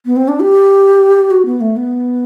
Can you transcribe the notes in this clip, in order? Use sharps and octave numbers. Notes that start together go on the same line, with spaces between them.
B3
C4
D4
G4
F#4
B3
A3
B3